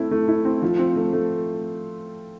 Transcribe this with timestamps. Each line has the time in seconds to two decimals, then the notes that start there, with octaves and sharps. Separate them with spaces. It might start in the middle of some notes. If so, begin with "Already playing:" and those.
Already playing: A3 C4 E4
0.11 A3
0.28 E4
0.45 C4
0.62 F3
0.79 C4
0.96 A3
1.13 A3